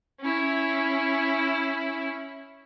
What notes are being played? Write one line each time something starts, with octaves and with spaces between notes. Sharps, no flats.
C#4 E4